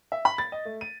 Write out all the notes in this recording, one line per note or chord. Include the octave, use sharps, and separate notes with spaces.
E5
B5
A6
D#5
A3
D#7